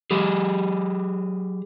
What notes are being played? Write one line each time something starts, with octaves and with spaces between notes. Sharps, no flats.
F#3 G4 G#4